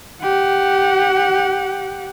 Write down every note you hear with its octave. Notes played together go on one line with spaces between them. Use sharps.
G4 F#5